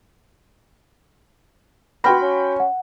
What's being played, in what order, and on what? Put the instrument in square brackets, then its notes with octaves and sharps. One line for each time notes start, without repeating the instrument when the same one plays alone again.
[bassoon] B3 [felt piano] F#4 G5 B5 [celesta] C6 F6 A#6
[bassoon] C#4
[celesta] F#5